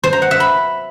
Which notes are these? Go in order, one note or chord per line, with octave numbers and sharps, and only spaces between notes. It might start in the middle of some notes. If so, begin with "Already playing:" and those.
C5
A#5
F#5
E5
B5